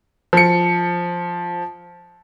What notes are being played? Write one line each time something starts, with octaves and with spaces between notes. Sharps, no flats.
F3 C#7